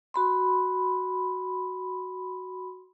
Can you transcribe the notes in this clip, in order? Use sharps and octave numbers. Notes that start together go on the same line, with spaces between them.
F#4 B5 C6